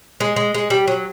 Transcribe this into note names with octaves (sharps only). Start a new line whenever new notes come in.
G#3
G#3
G#3
G3
F#3